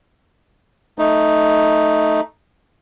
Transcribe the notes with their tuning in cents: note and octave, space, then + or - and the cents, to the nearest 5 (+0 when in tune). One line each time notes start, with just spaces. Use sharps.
A3 +0 D#4 +0